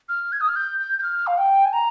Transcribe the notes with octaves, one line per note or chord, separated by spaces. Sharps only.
F6
G#6
D#6
F6
G6
G6
G6
F6
F5
G5
G#5
A#5